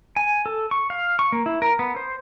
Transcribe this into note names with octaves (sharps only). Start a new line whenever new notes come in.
G#5
A4
C#6
F5
C#6
A#3
E4
A#4
B3
C5